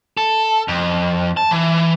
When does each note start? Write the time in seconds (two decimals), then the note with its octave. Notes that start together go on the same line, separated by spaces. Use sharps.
0.17 A4
0.68 F2
1.37 A5
1.51 E3